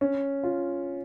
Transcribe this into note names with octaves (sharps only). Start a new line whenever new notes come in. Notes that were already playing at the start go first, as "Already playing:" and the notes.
C#4
F4